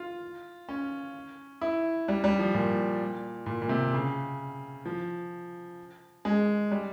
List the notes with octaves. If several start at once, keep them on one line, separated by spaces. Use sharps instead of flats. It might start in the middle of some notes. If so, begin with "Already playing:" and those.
Already playing: F4
C#4
E4
G3
G3
F3
A#2
A#2
A#2
C3
C#3
F3
G#3
G3